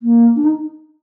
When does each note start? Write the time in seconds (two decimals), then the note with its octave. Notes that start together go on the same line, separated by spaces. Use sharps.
0.02 A#3
0.36 D4
0.45 D#4